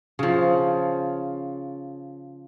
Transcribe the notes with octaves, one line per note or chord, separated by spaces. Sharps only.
C#3 F3